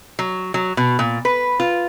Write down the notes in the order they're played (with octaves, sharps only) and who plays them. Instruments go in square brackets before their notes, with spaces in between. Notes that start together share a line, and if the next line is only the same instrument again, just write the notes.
[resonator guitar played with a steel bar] F#3
F#3
B2
A#2
B4
F4